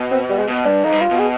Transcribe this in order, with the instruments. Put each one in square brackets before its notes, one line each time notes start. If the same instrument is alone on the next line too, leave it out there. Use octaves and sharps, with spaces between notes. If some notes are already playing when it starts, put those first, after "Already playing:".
Already playing: [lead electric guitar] B2
[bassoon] C4
G3
G#3
[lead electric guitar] B2
[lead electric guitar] G2 [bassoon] D4
[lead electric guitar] F2 [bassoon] D#4
[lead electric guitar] G2
[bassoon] F4
[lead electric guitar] B2
[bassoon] G#4